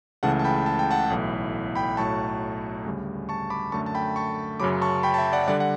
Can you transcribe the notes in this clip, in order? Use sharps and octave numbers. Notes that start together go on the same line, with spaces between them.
C#2 C#3 E3 A3 F#5 A5
A5
G5 B5
A5
G5
F#5 A5
B1 A2 E3
G5 B5
B1 A2 F#3 A5 C#6
D2 C#3 G3
A5 C#6
B5 D6
F#2 D3 A3 A5 C#6
A5
G5 B5
A5 C#6
F#2 C#3 F#3 B5 D6
A5 C#6
G5 B5
A5
E5 G5
D5 F#5
D3 G3 D5 F#5
F#5